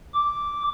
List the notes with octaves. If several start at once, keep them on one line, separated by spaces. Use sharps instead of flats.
D6